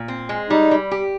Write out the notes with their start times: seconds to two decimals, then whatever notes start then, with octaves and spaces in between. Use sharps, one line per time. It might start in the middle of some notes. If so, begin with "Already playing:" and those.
Already playing: A#2
0.08 C4
0.29 G#3
0.50 G3 D#4
0.71 G3
0.91 G4